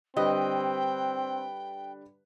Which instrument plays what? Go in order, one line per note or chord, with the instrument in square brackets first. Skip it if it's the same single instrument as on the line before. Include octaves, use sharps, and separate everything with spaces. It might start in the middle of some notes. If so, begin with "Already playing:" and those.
[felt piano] D3 G3 B4 [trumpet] C4 [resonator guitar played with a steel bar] D#5 [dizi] G5